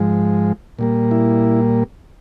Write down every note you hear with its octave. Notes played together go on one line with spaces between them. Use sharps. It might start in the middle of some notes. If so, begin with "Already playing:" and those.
Already playing: G#2 F3 G#3
A#2 G3 A#3
E4